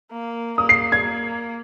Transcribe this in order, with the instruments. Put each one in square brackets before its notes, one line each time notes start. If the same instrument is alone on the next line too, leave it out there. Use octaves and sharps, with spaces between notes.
[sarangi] A#3
[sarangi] A#3 [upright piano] D#6
[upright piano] C7
G#6
[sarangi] A#3